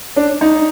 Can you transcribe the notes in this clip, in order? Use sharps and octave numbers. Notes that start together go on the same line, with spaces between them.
D4
D#4